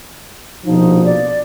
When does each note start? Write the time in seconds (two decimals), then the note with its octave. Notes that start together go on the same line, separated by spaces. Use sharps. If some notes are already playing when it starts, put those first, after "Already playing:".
0.65 A#1 B2 F3 D#4
1.05 D5